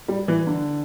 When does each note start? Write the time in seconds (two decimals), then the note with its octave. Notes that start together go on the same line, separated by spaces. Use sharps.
0.08 G3
0.28 E3
0.47 D3